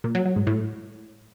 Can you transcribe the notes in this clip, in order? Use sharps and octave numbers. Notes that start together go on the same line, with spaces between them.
A#2
F#3
F#3
G#2
A2